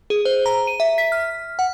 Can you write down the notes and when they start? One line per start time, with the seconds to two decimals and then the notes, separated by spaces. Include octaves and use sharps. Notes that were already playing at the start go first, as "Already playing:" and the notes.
0.10 G#4
0.25 C5
0.46 A#5
0.67 D#7
0.80 E5
0.98 B6
1.12 F6
1.59 F#5